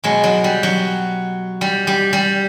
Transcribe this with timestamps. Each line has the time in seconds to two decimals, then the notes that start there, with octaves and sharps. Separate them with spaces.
0.04 B2 F#3 G#3
0.24 F#3
0.44 G3
0.63 F#3
1.61 G3
1.87 G3
2.13 G3